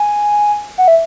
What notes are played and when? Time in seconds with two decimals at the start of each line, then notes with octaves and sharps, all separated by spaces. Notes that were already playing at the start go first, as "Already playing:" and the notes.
Already playing: G#5
0.78 F#5
0.88 E5